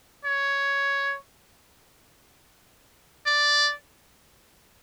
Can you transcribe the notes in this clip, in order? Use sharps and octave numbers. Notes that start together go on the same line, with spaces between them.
C#5
D5